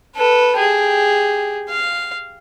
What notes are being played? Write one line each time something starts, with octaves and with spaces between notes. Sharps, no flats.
A4 B4
G4 G#4
F5